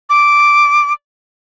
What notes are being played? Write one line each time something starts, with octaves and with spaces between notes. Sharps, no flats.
D6